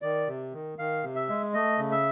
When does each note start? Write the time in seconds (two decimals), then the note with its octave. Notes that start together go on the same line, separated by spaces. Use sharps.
0.02 D#3 D5
0.28 C3
0.53 D#3
0.78 D#3 F5
1.04 C3
1.16 E5
1.29 G#3
1.54 A3 D#5
1.78 C#3
1.92 E5